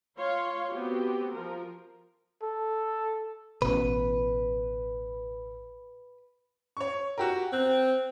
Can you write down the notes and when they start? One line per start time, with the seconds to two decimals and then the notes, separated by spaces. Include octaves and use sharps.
0.18 F4 C#5 F5 C6
0.72 B3 C4 F#4 G4
1.33 F3 A#4
2.43 A4
3.62 A1 B2 B4
6.77 C#5 C#6
7.18 F#4 G4 A#4
7.53 C4 F#6